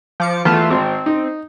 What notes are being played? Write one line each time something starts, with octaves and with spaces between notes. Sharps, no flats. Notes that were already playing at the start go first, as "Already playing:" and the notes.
F3 D6 C#7
E2 A3 B3 F4 A5
G#1 C4
D#4